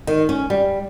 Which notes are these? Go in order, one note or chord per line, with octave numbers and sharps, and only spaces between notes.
D#3
C#4
G3